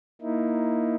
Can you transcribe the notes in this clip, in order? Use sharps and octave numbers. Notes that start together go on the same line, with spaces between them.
A#3 D#4 E4